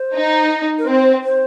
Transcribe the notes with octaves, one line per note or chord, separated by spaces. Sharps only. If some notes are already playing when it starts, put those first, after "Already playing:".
Already playing: C5
D#4
A#4
C4 C5
C5